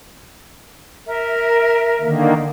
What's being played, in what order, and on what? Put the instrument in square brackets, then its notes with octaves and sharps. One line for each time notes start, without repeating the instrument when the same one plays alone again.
[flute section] A#4 E5
[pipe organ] D3 D#3 A#3